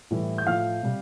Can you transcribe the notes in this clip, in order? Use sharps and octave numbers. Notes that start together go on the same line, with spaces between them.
A2 E3 G3
G6
A2 F3 F5 F6
C3 G3